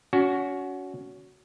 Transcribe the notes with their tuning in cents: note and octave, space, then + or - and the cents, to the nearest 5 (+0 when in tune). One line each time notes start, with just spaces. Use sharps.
C#4 +30 F#4 +0